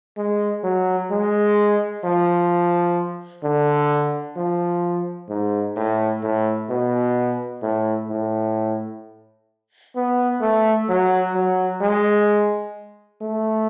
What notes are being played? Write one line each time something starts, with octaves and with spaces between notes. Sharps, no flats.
G#3
F#3
G#3
F3
D3
F3
G#2
A2
A2
B2
A2
A2
B3
A3
F#3
F#3
G#3
A3